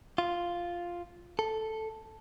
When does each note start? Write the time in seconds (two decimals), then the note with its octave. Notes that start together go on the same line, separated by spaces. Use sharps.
0.18 F4
1.39 A4